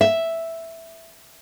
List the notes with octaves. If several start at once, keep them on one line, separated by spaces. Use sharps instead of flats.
E5